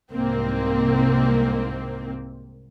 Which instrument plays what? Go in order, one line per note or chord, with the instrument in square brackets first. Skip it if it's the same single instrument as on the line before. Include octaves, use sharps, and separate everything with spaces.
[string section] C2 G#2 A#3 C4